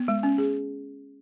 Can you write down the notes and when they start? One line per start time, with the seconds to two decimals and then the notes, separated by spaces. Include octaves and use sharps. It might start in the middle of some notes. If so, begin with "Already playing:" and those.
Already playing: B3
0.08 G#3
0.23 C#4
0.38 G#4